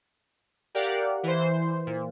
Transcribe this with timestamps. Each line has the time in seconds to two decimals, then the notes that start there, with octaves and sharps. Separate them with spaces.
0.75 G4 A#4 D5 F5 F#5
1.23 E3 C5
1.87 A#2